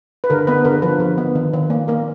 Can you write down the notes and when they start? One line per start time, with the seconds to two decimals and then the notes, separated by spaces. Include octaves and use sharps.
0.24 B4
0.30 D3 A#4
0.47 B3 B4
0.65 D3 A#4
0.82 F3 B4
1.00 D3
1.18 B3
1.35 D#3
1.53 D#3
1.70 A#3
1.88 A#3 A#4